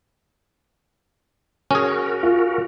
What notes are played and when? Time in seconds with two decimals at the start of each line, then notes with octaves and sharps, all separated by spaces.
1.71 C#4 F#4 G#4 A#4
2.23 F4